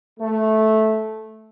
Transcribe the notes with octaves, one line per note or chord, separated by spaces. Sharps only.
A3